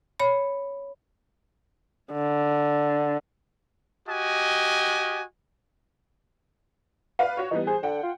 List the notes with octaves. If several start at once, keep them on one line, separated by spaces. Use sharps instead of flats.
C#5 B5
D3
F#4 G4 D#5 G#5
B4 D5 F5
F#4 C#5
E3 G3 B3 D#4
G#4 C5
D3 F#5 G5
F4